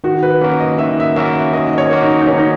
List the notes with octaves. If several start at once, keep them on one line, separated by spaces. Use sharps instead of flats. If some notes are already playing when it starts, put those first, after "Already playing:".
D#3 F#4
B4
A#3 C#4 F#4 A#4
D#5
D#3 E5
E5
A#3 C#4 F#4 A#4 E5
D#3 D#5
D#5
C#5
A#3 C#4 F#4 A#4
D#4
D#4
D#3 C#4
D#4